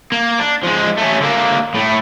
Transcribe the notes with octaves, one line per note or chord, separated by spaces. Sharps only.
A#3
D4
F3 G#3
A3 C#4
D3 A#3
A2 A3